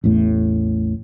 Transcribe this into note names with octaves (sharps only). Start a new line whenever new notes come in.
A1 E2 A2 A3